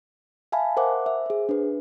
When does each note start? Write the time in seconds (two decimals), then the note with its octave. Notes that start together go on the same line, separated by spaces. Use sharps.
0.52 E5 F5 G#5 A5 B5
0.77 A#4 C5 E5 F#5 D6
1.06 C5 E5
1.26 G#4 C5
1.49 D4 B4